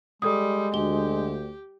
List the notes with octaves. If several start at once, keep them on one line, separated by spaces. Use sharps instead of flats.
G3 G#3 A4 D#6
D2 G4 G7